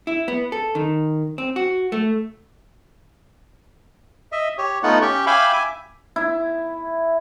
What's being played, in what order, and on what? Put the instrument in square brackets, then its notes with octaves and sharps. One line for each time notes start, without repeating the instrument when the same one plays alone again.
[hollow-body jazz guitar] E4
B3
A4
D#3
C4
F#4
A3
[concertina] D#5 E5
G4 C#5
A3 B3 D#4 F4 F#5
C#4 G4 G5 C#6
E5 F5 G5 G#5 B5 D6
E5 G#5 D6
[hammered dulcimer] E4